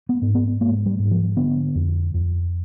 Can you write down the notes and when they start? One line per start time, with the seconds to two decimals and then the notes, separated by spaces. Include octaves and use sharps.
0.09 B3
0.22 G#2
0.35 B3
0.60 G#2 A#3
0.86 G3
0.99 G#2
1.11 F3
1.37 D3 B3
1.75 F2
2.14 F2